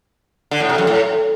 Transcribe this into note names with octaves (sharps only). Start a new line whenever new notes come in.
D3
A2
C3
F#2
A2